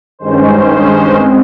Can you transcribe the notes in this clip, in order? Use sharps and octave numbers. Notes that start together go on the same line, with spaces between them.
G2 D#3 G#3 C#4 C5
G#3 C4